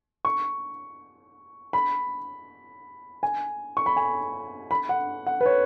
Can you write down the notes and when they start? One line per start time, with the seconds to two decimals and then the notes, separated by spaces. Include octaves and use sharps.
0.25 C#6
1.73 B5
3.23 G#5
3.77 C#6
3.86 B5
3.97 G#5
4.71 B5
4.89 F#5
5.27 F#5
5.41 B4
5.46 C#5